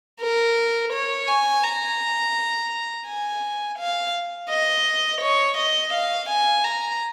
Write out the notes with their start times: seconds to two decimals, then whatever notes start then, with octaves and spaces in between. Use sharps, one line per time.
0.20 A#4
0.93 C#5
1.28 G#5
1.64 A#5
3.07 G#5
3.78 F5
4.50 D#5
5.21 C#5
5.57 D#5
5.93 F5
6.29 G#5
6.64 A#5